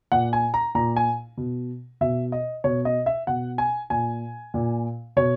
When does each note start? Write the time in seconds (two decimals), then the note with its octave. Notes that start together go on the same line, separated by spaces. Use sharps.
0.12 A#2 F#5
0.33 G#5
0.54 A#5
0.75 A#2 A#5
0.96 G#5
1.37 B2
2.01 B2 E5
2.32 D#5
2.64 B2 C#5
2.85 D#5
3.06 E5
3.27 B2 F#5
3.58 G#5
3.90 A#2 G#5
4.54 A#2
5.16 B2 C#5